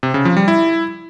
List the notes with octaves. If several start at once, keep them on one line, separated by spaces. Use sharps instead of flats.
C3
C#3
F3
G3
E4